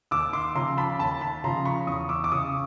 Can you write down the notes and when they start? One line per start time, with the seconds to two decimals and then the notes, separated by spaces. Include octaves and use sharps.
0.11 D#2 D6 E6
0.33 C6 D6
0.55 C#3 F3 A#5 C6
0.77 A5 B5
0.99 D#2 A5 B5
1.21 A5 B5
1.44 C#3 F3 A#5 C6
1.65 B5 C#6
1.87 E2 C#6 D#6
2.09 D6 E6
2.24 D6
2.31 C#3 E3 C#6 D#6